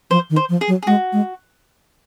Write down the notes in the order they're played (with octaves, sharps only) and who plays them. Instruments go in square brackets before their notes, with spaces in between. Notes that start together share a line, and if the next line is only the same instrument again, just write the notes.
[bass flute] F3 [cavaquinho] C5
[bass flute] D#3
[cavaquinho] C5
[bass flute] F3
[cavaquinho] G#4
[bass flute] F#3
[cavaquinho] G#4
[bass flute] G#3 [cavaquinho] F#4
[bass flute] G#3